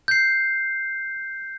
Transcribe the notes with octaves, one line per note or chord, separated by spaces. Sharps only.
G6 C7